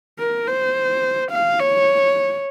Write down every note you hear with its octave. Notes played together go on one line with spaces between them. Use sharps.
A#4
C5
F5
C#5